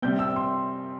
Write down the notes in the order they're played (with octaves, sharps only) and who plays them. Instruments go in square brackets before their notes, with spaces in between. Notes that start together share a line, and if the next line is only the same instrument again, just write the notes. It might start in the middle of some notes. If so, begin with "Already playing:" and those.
[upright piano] C3 G3 C4 G6
E6
C6